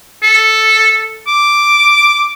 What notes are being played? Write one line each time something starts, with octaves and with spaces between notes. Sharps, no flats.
A4
D6